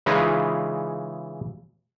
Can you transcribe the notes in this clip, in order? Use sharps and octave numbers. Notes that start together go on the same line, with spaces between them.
C#3 E3 G#3 D#4 F4 B4